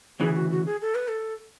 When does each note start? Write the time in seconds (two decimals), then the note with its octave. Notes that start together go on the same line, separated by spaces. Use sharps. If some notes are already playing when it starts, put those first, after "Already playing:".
0.20 D2 C#3 E3 G#4
0.35 F#4
0.51 F#4
0.66 G#4
0.82 A4
0.95 B4
1.08 A4